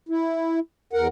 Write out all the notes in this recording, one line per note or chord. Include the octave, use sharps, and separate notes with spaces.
E4
E2 A#4 F#5